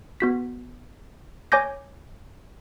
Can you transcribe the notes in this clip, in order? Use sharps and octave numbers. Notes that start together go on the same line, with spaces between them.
B3 F#4 B6
C#5 G#5 D6 G6 A#6